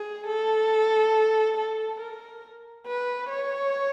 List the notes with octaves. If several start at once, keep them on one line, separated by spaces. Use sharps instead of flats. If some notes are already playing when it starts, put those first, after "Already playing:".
Already playing: G#4
A4
A4
A#4
B4
C#5